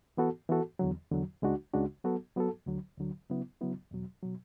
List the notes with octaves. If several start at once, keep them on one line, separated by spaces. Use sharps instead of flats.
E3 B3 F#4 A4
E3 B3 F#4 A4
E2 D3 F#3
E2 D3 F#3
C#2 C#3 G#3 D4 F#4
C#2 C#3 G#3 D4 F#4
F#3 B3 F#4 A4
F#3 B3 F#4 A4
D2 D3 F#3
D2 D3 F#3
C#3 F#3 B3 E4
C#3 F#3 B3 E4
E2 B2 F#3
B2 F#3